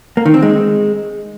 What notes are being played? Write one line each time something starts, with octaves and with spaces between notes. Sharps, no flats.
A#3
D#3
C4
G#3